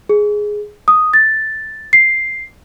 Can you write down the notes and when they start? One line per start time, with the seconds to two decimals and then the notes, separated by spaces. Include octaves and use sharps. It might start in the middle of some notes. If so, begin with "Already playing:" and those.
0.09 G#4
0.88 D#6
1.13 A6
1.93 C7